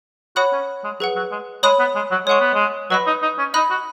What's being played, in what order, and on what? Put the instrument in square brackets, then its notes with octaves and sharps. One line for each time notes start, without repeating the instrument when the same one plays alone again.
[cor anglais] F#4 [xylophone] C#5 F#5 B5 D#6 F#6
[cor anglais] C#4
G#3
[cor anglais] F#3 [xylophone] G#4 B4 F#5
[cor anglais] F#3
G#3
[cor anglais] G#3 [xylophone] C#5 B5 D#6 F#6
[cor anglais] B3
G#3
F#3
[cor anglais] G#3 [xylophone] C#5 F#5 C#6
[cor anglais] B3
G#3
[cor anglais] F#3 [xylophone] B4 D#5 B5
[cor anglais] D#4
D#4
C#4
[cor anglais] D#4 [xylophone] D#5 B5 F#6
[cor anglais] F#4